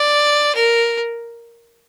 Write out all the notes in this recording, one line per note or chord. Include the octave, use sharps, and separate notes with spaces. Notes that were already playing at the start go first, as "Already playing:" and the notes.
Already playing: D5
A#4